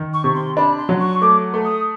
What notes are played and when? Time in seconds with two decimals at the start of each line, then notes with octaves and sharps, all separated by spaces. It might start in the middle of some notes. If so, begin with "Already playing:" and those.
Already playing: D#3
0.13 C#6
0.24 C3
0.34 C6
0.56 D4 B5
0.78 C6
0.89 F#3
1.00 C#6
1.21 A3 D6
1.54 A3
1.64 D#6